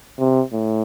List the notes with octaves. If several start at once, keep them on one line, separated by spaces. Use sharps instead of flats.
C3
A2